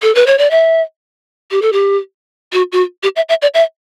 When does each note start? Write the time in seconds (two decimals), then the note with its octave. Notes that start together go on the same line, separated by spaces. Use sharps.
0.02 A4
0.15 B4
0.27 C#5
0.38 D5
0.51 E5
1.51 G4
1.62 A4
1.73 G4
2.53 F#4
2.72 F#4
3.03 G4
3.16 E5
3.29 E5
3.42 D5
3.54 E5